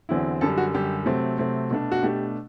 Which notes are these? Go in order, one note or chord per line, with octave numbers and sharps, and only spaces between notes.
E2 D3 F#3 C4 E4
F#2 D3 G3 A4
F#4
F#2 D3 G3 G4
C3 F#3 A3 C4
C3 F#3 A3 C4
B2 A3 D4
F#4
B2 A3 D4 G4